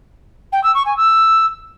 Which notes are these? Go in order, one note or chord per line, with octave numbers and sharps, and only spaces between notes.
G5
E6
C#6
G#5
E6